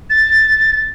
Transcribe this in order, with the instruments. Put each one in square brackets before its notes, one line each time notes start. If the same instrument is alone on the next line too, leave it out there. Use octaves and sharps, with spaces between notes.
[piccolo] A6